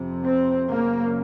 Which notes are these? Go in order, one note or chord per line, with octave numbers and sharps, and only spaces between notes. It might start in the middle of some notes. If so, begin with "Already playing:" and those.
Already playing: F2 C3
C4
F#2 C#3 A#3